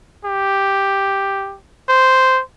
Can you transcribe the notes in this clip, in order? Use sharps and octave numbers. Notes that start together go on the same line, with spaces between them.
G4
C5